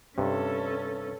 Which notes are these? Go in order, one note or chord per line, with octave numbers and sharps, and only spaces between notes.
G2 C3 C#4 A4